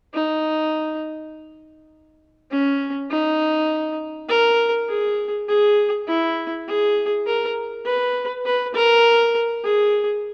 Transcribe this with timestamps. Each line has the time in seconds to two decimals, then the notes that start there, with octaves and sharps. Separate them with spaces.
0.14 D#4
2.51 C#4
3.11 D#4
4.29 A#4
4.89 G#4
5.49 G#4
6.08 E4
6.67 G#4
7.26 A#4
7.85 B4
8.46 B4
8.75 A#4
9.64 G#4